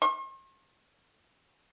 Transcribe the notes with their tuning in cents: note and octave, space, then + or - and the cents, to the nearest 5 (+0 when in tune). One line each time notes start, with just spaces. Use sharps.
C6 +45